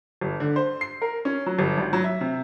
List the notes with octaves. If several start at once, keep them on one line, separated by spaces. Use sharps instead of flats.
G1
D3
C5
C7
A#4
C#4
F#3
G1
G#1
F#3
E5
C3